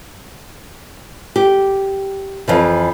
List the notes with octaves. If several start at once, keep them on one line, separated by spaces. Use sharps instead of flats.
G4
F2 E3 F3